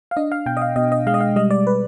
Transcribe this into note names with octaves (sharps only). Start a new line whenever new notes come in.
F5
D4 D#5
F5
B2 G5
D#5
F5
B2 D#5
D#5
G#3 F5
D#5
F5
G3 D#5
D5
B4